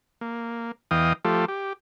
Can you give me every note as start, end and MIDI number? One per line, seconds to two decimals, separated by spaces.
0.21 0.72 58
0.91 1.13 40
0.91 1.13 52
0.91 1.13 75
0.91 1.13 77
0.91 1.13 79
0.91 1.13 87
1.25 1.45 53
1.25 1.45 57
1.25 1.45 65
1.25 1.45 67
1.25 1.45 69
1.48 1.73 67